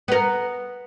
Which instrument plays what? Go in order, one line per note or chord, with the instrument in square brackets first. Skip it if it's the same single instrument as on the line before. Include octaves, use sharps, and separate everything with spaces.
[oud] B3 A#4